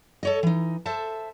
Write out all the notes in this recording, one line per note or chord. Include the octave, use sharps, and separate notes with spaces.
A4 C#5 D#5
E3 D#4
A4 C5 E5 A5